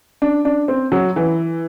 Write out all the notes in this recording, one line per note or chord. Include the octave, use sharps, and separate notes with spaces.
D4
D4
C4
F#3
E3